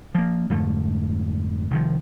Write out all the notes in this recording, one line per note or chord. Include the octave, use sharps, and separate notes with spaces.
F3 A#3
F2 G#2 D3 A3
C2 D#3 F3